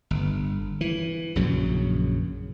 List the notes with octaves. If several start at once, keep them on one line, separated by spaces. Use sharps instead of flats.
G1
E3
A#1 F#2 C#3 F#3